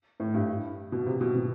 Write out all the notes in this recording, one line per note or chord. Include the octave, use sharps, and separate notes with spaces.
A2
G2
B2
C3
B2
B2